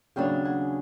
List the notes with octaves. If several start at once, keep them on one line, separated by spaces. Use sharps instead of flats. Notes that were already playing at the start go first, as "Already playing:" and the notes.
D#2 C#3 F#3 B3 D4 F5 G5
F#5 G#5